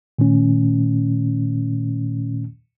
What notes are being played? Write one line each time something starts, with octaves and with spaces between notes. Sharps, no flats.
A#2 D#3 A3 C#4